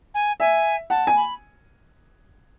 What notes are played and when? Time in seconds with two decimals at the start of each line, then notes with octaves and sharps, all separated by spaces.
0.14 G#5
0.40 E5 G#5
0.90 F#5 A5
1.07 G#5
1.16 B5